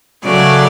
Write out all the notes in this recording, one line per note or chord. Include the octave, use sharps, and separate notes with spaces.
C#3 F#3 A3 D5